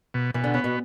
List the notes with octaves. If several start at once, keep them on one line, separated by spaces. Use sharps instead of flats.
B2
B2 E3
D3
C#3 B3
B2